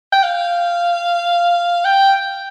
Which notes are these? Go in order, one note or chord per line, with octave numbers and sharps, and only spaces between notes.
G5
F5
G5